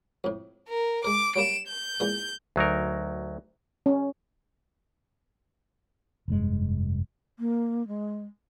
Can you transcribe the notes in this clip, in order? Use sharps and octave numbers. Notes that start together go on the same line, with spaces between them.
F2 A2
A#4
G#3 A#4 D6
F#3 G3 A#3 D7 E7
G6
E2 A#2 G#3
D2 F#3 D#4 A#4
C#4
F1 G2 G#3
A#3
G#3